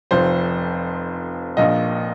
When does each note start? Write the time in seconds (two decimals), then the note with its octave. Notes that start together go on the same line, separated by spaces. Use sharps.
0.11 F1 F2 F3 C5
1.57 A#1 A#2 F3 D#5